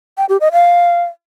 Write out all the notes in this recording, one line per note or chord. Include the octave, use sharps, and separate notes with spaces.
G5
G4
D#5
F5